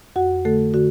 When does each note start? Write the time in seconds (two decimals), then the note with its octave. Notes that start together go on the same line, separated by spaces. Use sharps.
0.16 F2 F#4 F#5
0.45 D3 A3 A4
0.74 D3 F#4